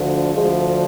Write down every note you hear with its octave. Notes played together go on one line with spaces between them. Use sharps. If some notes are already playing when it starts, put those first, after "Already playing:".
Already playing: D2 D3 F3
D2 D3 F3 G#3